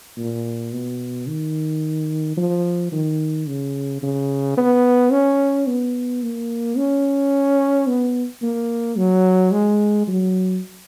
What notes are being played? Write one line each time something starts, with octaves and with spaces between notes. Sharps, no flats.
A#2
B2
D#3
F3
D#3
C#3
C#3
B3
C#4
B3
A#3
C#4
B3
A#3
F#3
G#3
F#3